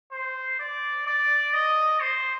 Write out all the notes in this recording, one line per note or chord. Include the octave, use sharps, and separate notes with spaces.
C5
D5
D5
D#5
C5